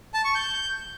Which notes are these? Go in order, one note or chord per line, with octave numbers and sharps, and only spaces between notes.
A5
C#6
G6